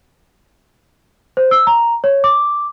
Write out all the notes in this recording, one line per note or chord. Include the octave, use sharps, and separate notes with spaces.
C5
E6
A#5
C#5
D6